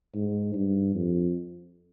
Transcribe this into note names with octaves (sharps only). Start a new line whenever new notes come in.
G#2
G2
F2